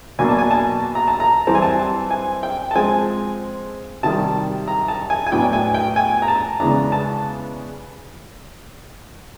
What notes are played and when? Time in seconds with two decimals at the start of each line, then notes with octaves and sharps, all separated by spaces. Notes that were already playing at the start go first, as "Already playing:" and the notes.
0.19 B2 F#3 A#3 D4 G#5
0.29 A5
0.38 G#5
0.51 A5
0.95 A#5
1.08 A5
1.20 A#5
1.47 E3 G3 C4 A5
1.55 G#5
1.62 A5
1.79 A5
2.11 G#5
2.43 G5
2.71 A5
2.75 F3 G#3 C4 G#5
4.03 C3 D#3 G3 A5
4.68 A#5
4.88 A5
5.10 G#5
5.27 G#5
5.32 A2 F#3 B3 D4 G5
5.53 G#5
5.74 G5
5.96 G#5
6.22 A#5
6.28 A5
6.60 C#3 E3 G#3 B3 D4 A#5
6.92 A5